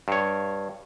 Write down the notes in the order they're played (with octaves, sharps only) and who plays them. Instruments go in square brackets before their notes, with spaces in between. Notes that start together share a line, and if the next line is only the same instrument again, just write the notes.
[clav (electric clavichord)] G2 C#5